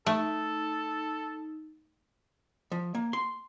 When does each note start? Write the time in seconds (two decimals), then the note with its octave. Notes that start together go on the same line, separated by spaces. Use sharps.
0.06 A3 D#4 A4
2.72 F3
2.95 A#3
3.13 C6